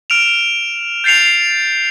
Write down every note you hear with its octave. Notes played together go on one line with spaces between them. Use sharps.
F6 D7 E7 F7
G6 A6 C7 C#7 F7